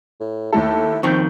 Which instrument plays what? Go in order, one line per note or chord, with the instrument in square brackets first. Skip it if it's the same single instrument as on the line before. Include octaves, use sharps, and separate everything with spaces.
[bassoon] A2
[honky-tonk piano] D#2 A3 A4 [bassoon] E4
[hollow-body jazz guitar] F2 D#3 [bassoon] C4 [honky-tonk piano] C#6 G6